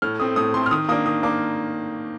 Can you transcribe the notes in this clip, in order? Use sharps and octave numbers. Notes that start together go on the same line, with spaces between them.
A2 F6
A3 C4 D#6
A2 D#6
A3 C4 C6
F6
D#3 D#6
A#3 D4 D#6
D#3 D#6
A#3 D4 D6